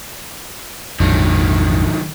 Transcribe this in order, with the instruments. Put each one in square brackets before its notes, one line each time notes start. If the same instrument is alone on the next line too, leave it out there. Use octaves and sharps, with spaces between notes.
[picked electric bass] A#1 F2 G#2 [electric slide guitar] D3 D#3 F#3